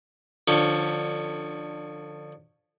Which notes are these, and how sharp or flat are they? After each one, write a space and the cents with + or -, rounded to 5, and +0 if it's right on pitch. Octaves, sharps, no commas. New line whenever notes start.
D3 +25 F3 +10 C#4 +0